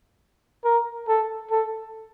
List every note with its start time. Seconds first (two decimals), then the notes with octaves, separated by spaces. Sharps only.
0.64 A#4
1.08 A4
1.51 A4